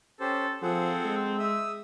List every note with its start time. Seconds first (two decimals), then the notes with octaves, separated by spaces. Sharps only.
0.20 C#4 G4 A4 C5
0.62 F3 C4 G#4 A4 F#5
1.05 G#3
1.39 E5 D#6 E6